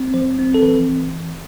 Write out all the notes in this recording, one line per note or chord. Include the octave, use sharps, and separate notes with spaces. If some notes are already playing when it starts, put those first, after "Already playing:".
Already playing: C4
F3 C5
C4
A4
E3 B4